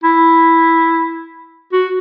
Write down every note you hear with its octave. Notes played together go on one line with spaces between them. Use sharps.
E4
F#4